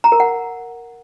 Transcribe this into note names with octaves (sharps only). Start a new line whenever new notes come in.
A#5
A#4
F#5